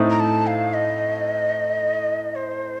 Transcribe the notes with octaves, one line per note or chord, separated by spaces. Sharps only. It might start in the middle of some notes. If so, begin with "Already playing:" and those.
Already playing: A2 A3 C4 D#4
A#5
A5
F5
D#5
C5